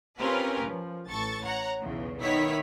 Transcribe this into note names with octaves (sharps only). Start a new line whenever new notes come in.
C4 C#4 F4 G4 A#4 B4
F3
A1 A4 C#6 A6
C#5 F#5 A#5
B1 E2 C#3
D#3 B3 E4 C#5 B6